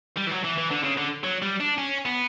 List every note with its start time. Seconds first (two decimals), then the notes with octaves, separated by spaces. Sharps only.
0.17 G3
0.27 E3
0.31 F#3
0.44 E3
0.58 E3
0.71 D3
0.84 C#3
0.98 D3
1.24 F#3
1.42 G3
1.60 D4
1.78 C#4
2.05 B3